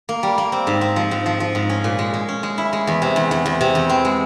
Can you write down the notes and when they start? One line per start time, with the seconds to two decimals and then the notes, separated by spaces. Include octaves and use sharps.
0.09 A#3
0.23 G3
0.38 A#3
0.52 C4
0.67 G#2
0.81 C4
0.96 F3
1.11 G#2
1.26 F3
1.40 F3
1.55 G#2
1.69 C#4
1.84 A#2
1.99 G#3
2.14 G#3
2.29 C#4
2.43 G#3
2.58 E4
2.73 G#3
2.87 E2
3.02 C3
3.16 E2
3.31 E2
3.46 E2
3.61 C3
3.75 E2
3.89 C4
4.05 G#3